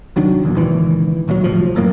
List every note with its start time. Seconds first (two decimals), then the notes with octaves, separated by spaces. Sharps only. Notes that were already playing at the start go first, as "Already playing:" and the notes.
0.16 C2 D#3 F#3 D4
0.43 B1 E2 A#2
0.56 C#2 A#2 D#3 E3
1.28 A#1 D#2 D3 F#3
1.44 C2 A2 F3
1.75 E1 F#2 A2 A#3